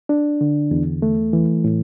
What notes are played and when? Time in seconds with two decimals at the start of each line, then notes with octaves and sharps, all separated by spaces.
0.09 D4
0.41 D3
0.71 E2
1.02 A3
1.33 E3
1.65 A2